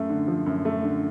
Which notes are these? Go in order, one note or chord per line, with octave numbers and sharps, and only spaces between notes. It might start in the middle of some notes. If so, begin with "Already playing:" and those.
Already playing: F#2 A3
D3
F3
F#2
A3
D3